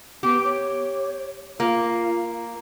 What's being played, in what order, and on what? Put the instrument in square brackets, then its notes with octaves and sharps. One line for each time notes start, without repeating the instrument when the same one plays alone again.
[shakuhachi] B3 [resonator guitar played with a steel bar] G4
[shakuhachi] C#5
[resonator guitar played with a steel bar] A#3 [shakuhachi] F4